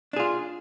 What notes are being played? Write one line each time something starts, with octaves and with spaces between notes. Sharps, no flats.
D4 F4 G#4